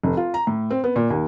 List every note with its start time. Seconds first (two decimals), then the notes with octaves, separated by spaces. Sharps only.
0.04 F1
0.17 F4
0.34 A#5
0.47 A2
0.71 C4
0.84 B3
0.96 A#2
1.10 D#2